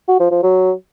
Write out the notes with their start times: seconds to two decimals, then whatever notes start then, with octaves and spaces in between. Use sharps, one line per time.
0.08 F#4
0.20 F3
0.31 F3
0.43 F#3